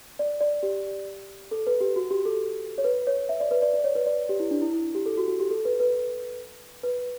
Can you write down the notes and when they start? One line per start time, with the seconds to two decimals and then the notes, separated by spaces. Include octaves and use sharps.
0.19 D5
0.41 D5
0.63 G4
1.51 A4
1.67 B4
1.81 G4
1.96 F#4
2.11 G4
2.25 A4
2.78 C#5
2.84 B4
3.07 C#5
3.29 E5
3.40 D5
3.51 B4
3.62 D5
3.73 D5
3.84 C#5
3.95 B4
4.06 D5
4.29 G4
4.40 E4
4.51 D4
4.61 E4
4.73 E4
4.95 G4
5.06 A4
5.18 F#4
5.28 F#4
5.40 G4
5.51 A4
5.65 B4
5.80 B4
6.83 B4